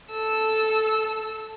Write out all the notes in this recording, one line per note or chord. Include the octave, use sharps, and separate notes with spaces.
A4 E6